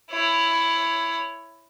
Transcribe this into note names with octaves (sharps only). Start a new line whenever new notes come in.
E4 C#5